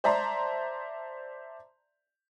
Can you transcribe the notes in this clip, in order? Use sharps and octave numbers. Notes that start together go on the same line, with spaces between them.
C5 D5 E5 A5 A#5 C6